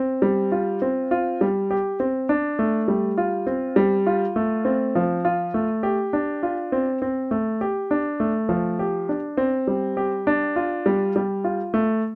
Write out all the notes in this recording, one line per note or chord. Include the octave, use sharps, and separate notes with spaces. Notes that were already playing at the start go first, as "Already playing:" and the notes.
Already playing: C4
G3
F4
C4
F4
G3
G4
C4
D4
A3
G3
F4
C4
G3
F4
A3
C4
F3
F4
A3
G4
D4
F4
C4
C4
A3
G4
D4
A3
F3
G4
D4
C4
G3
G4
D4
F4
G3
G3
F4
A3